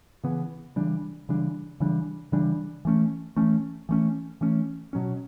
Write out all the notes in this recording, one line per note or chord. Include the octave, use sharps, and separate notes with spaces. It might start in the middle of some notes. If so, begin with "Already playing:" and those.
C#3 E3 B3
C#3 E3 G3 D4
C#3 E3 G3 D4
C#3 E3 G3 D4
C#3 E3 G3 D4
E3 A3 C#4
E3 A3 C#4
E3 A3 C#4
E3 A3 C#4
B2 F#3 C#4